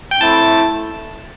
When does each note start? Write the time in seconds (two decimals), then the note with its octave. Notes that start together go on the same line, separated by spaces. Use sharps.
0.11 G5
0.21 A3 C4 E4 A5